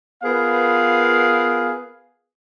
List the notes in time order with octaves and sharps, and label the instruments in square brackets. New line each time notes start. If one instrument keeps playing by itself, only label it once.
[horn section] B3 F4 G#4 A#4 B4 F5